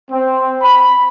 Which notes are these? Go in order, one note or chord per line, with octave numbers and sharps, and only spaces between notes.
C4
B5